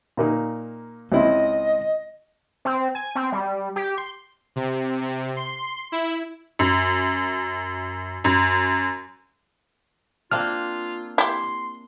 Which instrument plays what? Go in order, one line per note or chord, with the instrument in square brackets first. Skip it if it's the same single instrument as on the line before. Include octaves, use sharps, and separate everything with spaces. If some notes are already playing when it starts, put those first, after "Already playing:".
[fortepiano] A#2 A#3 D#4
[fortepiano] C#2 C4 E4 [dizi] D#5
[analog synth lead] C4
G#5
C4
G3
G4
C6
[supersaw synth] C3
C3
C6
E4
[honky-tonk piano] F#2
F#2
[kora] A#3 C4 D4 [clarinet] F4 [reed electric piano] F6
[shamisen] E4 G4 [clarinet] C6